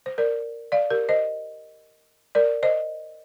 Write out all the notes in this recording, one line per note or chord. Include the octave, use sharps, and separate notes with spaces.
C5
A#4 D5
D5 F5
G4 A#4
C5 D#5
A#4 D5
C5 D#5